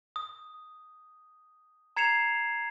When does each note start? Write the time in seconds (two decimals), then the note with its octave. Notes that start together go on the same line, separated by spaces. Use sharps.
0.16 D#6
1.96 A#5 G#6 C7 C#7 E7 F7